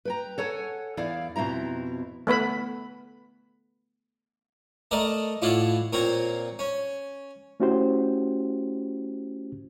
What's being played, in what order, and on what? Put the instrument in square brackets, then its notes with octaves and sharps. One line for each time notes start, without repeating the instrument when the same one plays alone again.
[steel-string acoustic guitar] B4 G5 A#5
A4 C#5 F#5 G#5
E2 E4 D5 F5
F2 B2 C4 E4 A#5
[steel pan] A3 B3 B4 B5
[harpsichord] A3 A4 A#4 D5 D#5
A2 E4 F4 D5 F#5
A#2 C4 A#4 C#5
C#4
[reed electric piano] A3 C#4 E4 F#4 G4 C5